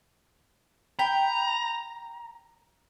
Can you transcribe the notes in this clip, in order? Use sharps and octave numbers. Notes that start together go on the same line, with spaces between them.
G5 A#5 B5